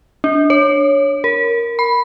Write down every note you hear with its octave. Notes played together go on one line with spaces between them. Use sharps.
D4
C#5
A#4
B5